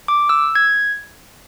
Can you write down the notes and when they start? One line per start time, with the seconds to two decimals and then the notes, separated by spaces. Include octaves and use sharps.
0.08 D6
0.29 E6
0.55 G#6